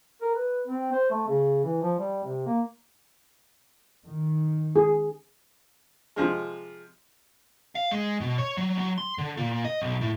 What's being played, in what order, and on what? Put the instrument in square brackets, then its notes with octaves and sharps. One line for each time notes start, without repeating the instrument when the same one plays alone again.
[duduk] A#4
B4
C4
C5
A3
C#3
E3
F3
G3
C3
A#3
[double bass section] D#3
[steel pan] G#4
[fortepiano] C3 F3 G#3
[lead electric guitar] F5
G#3
B2
C#5
F#3
F#3
C6
D3
A#2
D#5
B1
A2